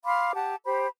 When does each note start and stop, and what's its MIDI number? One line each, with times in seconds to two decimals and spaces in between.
0.05 0.33 77
0.05 0.33 83
0.05 0.33 84
0.05 0.33 86
0.35 0.55 67
0.35 0.55 78
0.35 0.55 81
0.65 0.87 67
0.65 0.87 72
0.65 0.87 83